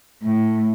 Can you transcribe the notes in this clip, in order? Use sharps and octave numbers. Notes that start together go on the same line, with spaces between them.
A2